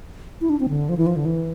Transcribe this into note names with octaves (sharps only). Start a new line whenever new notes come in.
E4
D4
C4
D3
F3
E3
F3
D3
E3